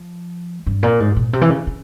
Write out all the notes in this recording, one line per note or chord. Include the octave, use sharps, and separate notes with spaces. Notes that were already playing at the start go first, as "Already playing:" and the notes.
Already playing: F3
G2
A#2
G#2
A#2
C3
E3
C#3
C#3